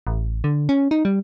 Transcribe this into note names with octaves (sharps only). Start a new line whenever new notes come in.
A1
D3
C#4
D#4
G3